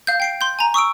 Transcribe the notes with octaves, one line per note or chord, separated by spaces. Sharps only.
F5 G6
G5 C7 D7
C6 G6
G#5 A#5
C#6 D#6 E6 D7